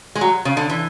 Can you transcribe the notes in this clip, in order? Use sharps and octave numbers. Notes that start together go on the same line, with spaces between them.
G#3
F#3
C#3
D3
E3